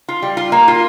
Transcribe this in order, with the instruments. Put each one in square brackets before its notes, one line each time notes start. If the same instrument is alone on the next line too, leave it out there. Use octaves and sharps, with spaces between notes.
[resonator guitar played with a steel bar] F4
G3
F4
A#3
F4